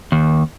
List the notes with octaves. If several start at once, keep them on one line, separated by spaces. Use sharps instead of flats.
D#2